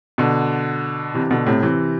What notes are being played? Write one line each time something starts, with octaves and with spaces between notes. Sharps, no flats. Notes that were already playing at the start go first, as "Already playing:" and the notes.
B2 D3
C3 E3
B2 D3
A2 C3
C3 E3